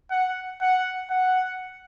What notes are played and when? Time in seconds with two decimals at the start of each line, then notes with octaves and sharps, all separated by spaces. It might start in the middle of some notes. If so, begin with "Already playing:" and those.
0.11 F#5
0.61 F#5
1.10 F#5